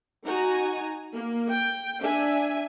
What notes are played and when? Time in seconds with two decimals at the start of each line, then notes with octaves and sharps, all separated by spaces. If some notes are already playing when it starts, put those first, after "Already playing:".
0.25 D#4 F#4 G#5 A#5
1.13 A#3
1.49 G5
1.99 D4 E5 G#5